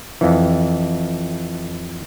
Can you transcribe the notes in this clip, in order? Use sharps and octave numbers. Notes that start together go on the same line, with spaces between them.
F2 E3